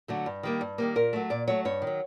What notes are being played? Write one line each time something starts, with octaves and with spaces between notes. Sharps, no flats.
D3 F#3 A3
G2
D#3 G3 A#3
G2
D#3 G3 A#3
A#2 A#4
F#3 A3
A#2 D5
F#3 A3 C#5
G2 C#5
D#3
F#3